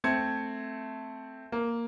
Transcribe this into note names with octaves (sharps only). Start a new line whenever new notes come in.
A3 C4 G#6 C#7
A#3